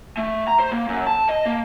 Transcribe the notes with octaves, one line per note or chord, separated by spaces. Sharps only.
A3
A#5
C5
A#3
F#2
A5
D#5
A#3